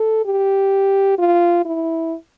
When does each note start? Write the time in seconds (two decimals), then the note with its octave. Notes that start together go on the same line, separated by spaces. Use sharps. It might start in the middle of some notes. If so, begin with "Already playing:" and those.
Already playing: A4
0.26 G4
1.19 F4
1.65 E4